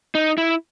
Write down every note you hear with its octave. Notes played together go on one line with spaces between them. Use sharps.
D#4
E4